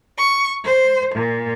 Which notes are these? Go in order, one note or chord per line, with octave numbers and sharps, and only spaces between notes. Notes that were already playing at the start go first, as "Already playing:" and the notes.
C#6
C5
A#2